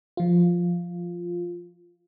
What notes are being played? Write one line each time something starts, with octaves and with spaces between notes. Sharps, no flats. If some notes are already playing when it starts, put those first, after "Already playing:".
F3 F4